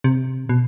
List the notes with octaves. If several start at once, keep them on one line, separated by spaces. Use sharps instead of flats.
C3
B2